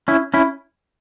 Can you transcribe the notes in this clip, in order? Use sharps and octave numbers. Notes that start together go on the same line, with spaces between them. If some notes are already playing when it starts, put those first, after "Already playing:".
C#4 E4
C#4 E4